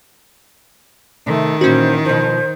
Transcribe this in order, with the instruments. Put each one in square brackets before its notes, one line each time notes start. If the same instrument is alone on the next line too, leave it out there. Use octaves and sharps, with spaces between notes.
[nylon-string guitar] C3 [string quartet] D#3 [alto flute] A3
[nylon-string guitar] A#2 E3 [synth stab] C#4 F#4 [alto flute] C5
[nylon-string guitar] B2 F3 [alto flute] C5